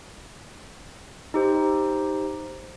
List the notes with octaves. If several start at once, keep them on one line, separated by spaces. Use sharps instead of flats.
D#4 G4 C5